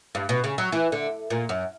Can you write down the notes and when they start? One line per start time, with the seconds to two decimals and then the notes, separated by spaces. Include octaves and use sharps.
0.15 G2
0.29 B2
0.44 C#3
0.58 F#3
0.72 E3
0.92 D3
1.30 A#2
1.49 F#2